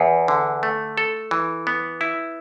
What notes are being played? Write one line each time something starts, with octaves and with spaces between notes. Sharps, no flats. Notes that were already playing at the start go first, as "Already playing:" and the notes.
Already playing: E2
D3
A3
A4
E3
B3
E4